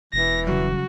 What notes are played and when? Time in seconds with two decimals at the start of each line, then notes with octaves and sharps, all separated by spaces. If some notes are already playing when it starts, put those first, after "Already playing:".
0.13 E1 E3 A#6
0.47 C#3 F#3 G3 F#4